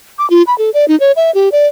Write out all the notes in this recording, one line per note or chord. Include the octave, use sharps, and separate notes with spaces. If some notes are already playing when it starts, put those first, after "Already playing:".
D6
F4
B5
A4
D5
D#4
C#5
E5
G4
D5